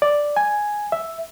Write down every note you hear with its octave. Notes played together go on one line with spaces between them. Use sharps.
D5
G#5
E5